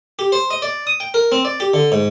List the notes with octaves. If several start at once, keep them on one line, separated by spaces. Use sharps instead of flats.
G4
C5
D#5
D5
D#6
G5
A#4
C4
D5
G4
D3
G#2